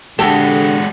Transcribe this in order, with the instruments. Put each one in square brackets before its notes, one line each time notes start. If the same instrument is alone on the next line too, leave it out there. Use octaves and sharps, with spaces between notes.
[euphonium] D3 [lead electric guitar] G#3 F#4 [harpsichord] G4 [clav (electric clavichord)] A4